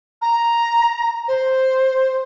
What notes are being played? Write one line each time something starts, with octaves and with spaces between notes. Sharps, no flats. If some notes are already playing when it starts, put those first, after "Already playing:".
A#5
C5